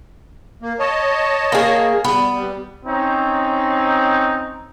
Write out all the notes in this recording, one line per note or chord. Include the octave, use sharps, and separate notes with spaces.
A#3
C#5 D#5 A5
A#3 G#4
G3 B3
G3
C4 C#4 D#4